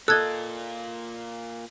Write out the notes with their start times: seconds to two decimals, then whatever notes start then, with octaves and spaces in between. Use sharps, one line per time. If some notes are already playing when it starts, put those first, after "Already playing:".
0.08 A#3 F4 A4 D#5 E6 F#6 G#6